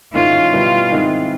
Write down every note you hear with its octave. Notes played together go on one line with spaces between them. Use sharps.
G#2 D#3 G#3 C#4 E4 F4
B2 G3 B3 E4
G#2 D#3 G#3 C4 E4